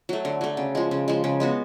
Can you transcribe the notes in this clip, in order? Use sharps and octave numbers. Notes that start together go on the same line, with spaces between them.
F#3 A3
D3
F#3 A3
C#3
F3 G#3
C#3
F3 G#3
C#3
G#3 B3 F#4